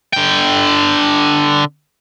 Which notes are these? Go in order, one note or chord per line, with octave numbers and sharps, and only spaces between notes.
D3 G5